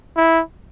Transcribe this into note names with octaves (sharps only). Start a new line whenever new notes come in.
E4